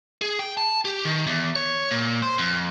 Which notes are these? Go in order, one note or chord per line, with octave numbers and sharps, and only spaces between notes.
G#4
G5
A5
G4
D#3
E2
C#5
A#2
C5
F2